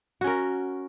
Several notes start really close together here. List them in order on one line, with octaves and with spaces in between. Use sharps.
F#4 C#4 A#4